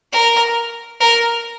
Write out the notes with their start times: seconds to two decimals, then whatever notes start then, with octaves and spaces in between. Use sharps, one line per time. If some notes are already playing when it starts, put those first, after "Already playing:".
0.12 A#4
1.00 A#4